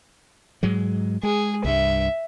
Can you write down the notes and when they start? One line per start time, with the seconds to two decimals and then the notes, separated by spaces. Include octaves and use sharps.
0.63 G#2 F#3 G#3
1.23 G#3 G#4
1.65 C2 G2 E5